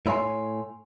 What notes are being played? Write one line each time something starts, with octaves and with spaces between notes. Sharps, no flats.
A2 E4 C#5 G#5 C6